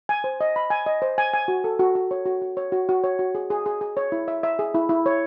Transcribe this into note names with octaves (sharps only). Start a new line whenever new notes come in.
G#5
C5
D#5
B5
G#5
D#5
C5
G#5
G#5
F#4
A4
F#4
F#4
C#5
F#4
F#4
C#5
F#4
F#4
C#5
F#4
G#4
G#4
G#4
G#4
C#5
E4
E5
E5
G#4
E4
E4
C#5